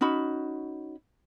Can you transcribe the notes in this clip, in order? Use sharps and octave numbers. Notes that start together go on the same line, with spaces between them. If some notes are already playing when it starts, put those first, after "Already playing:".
C#4 D#4 F#4 B5